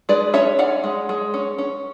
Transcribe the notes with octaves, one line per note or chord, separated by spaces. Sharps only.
G#3 B4 D5
C#4 C#5 E5
C#4 D5 F#5
G#3
G#3
C#4
C#4